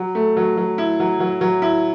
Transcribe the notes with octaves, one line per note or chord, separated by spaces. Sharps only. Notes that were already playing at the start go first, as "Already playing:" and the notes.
Already playing: F#3
A3
F#3
F#3
E4
F#3
F#3
F#3
E4